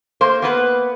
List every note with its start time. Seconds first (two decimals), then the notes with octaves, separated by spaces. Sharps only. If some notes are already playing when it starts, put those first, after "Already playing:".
0.21 A#3 C5
0.42 A#3 B3 B4